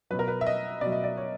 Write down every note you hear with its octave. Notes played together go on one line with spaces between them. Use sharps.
B2 F#3 B4
A#4
B4
E5
D#5
B2 F#3 D5
D#5
D5
C#5